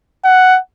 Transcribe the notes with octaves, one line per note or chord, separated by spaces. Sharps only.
F#5